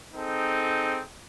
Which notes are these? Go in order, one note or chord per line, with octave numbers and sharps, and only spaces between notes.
C4 D#4 G#4 A4